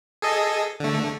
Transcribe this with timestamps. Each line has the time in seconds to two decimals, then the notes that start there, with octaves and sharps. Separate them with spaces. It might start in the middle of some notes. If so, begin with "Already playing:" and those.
0.22 G#4 A4 D#5
0.80 D3 A3